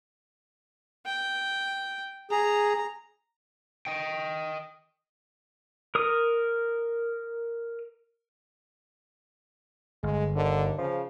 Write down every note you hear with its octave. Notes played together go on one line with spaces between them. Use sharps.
G5
G#4 A#5
D#5 G5
A#4 D#6 F6
G1 G#3
D#2 D3
C#3 F3